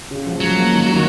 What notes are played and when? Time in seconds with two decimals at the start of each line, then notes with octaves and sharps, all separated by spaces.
0.11 C#3
0.26 F3
0.41 F#3 G#3
0.55 A#3
0.71 D#3
0.92 D#3